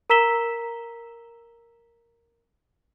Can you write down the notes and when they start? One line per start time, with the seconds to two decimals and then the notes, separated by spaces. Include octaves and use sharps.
0.10 A#4 A#5 E6 B6 E7 G7